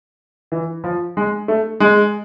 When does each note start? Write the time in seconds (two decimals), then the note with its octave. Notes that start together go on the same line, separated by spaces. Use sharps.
0.52 E3
0.84 F3
1.17 G#3
1.48 A3
1.80 G#3